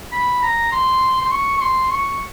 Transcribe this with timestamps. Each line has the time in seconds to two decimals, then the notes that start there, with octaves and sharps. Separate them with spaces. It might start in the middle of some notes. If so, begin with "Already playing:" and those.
0.12 B5
0.43 A#5
0.72 C6
1.22 C6
1.32 C#6
1.57 C#6
1.62 C6
1.91 C#6